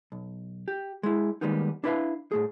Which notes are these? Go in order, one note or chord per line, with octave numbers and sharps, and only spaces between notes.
B1
G4
G#3 E4
D#3 G3 G#3 A#3 B3 D#4
D4 E4 B4 D5 E5 F5
A2 A3 G#4